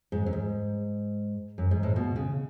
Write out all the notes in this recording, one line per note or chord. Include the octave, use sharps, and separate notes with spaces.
G#2
F#2
G#2
F#2
G#2
A2
B2
C#3